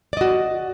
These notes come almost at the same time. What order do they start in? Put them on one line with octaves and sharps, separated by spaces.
D5 D#5 F#4